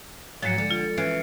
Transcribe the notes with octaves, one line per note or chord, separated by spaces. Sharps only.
G#2 F3 F#3 G#3 A6 C#7
D3
F4 A6
E3 C#4 F6 C7 D7